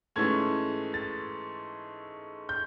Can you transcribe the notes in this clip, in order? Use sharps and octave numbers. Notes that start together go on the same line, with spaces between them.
G#2 E3 A3 C#4 G#6
A6
G6